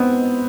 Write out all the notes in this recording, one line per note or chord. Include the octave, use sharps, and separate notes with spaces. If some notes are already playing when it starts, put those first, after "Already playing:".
Already playing: G#2 B3 C4